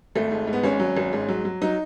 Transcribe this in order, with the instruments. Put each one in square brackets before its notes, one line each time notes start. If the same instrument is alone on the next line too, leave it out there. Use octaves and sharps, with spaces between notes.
[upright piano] G#1 A3
G#2
G#2
B3
G#1 C#4
F#3
G#1
G#2
F#3
F#3
F#3 D#4